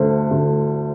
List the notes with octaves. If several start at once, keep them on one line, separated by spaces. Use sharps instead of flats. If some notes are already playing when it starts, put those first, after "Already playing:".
Already playing: D2 D3 A3 C5
D2